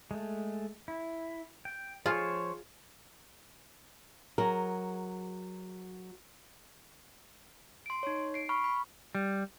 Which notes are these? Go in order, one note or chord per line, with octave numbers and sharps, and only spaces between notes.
G#3 A3
E4
G5
F3 F4 G#4 C5 C#5
F#3 G#4 A#4
C6 D7
D#4 C#5
C7 D7
B5 C#6 F6
B5
G3